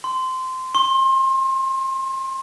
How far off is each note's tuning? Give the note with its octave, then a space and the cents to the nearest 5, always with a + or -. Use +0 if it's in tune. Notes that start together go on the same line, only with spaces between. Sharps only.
C6 -15
C6 +30